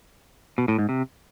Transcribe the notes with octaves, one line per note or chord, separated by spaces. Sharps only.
B2
A2
G#2
C3